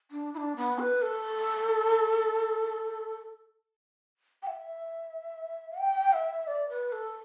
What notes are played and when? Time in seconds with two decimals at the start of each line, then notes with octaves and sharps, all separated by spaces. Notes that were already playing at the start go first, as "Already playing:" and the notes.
0.11 D4
0.34 E4
0.38 D4
0.56 B3
0.79 B4
1.02 A4
4.43 G5
4.47 E5
5.79 G5
6.13 E5
6.47 D5
6.69 B4
6.92 A4